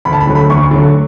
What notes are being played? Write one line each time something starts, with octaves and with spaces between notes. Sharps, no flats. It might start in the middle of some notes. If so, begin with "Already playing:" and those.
D2 B5
A5
B5
D3 F#3 A3
B5
D2 C#6
D3 F#3 A3